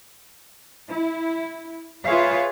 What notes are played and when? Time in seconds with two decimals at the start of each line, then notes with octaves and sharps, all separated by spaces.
0.90 E4
2.04 F4 G#4 B4 C#5 E5 F5